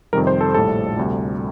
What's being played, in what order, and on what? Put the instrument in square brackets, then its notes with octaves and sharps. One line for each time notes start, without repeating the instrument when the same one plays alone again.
[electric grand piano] F2 C3 D#3 G3 A#4
C5
A4
A#1 A2 G3 A4
D2 C3 G3